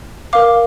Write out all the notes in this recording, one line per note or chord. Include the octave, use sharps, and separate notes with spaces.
A#4 F5 D6